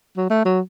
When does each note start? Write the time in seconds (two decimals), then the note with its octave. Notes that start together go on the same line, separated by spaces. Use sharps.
0.17 F#3
0.30 A3
0.45 F#3